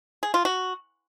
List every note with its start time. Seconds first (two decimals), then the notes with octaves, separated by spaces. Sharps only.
0.23 G#4
0.34 F4
0.45 F#4